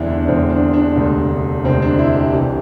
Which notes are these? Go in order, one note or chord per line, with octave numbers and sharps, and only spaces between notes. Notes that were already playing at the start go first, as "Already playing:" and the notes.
Already playing: E1 E2 D3 C4 D4 E4
D4
E1 E2 D3 C4
D4
D4
E1 D2 C3
E1 D2 C3 C4
D4
E4
G4
C2 C3 E3 G4